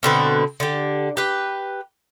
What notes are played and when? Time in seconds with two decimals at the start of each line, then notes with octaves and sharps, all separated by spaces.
0.03 B2 D3 C4 B4
0.60 D3 G4
1.17 G4 B4